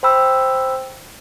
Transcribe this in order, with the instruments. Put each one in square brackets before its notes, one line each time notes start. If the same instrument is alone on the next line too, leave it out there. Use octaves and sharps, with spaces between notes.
[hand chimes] C5 G5 B5 E6